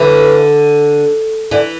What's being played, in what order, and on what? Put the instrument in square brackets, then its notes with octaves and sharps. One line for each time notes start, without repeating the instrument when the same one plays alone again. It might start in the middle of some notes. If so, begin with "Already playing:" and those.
Already playing: [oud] D3 [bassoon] E3
[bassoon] D3 [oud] E3